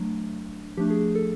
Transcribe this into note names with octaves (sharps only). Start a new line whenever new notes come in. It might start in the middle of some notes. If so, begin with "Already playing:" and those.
Already playing: F#3 A3 D4
F3 A3 D4 G4
G#4
A4